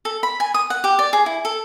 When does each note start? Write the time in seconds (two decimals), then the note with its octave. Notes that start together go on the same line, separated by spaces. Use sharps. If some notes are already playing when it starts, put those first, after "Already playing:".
0.05 A4
0.23 B5
0.40 G#5
0.54 D#6
0.70 F#5
0.84 G4
0.99 D5
1.13 G#4
1.26 E4
1.45 A4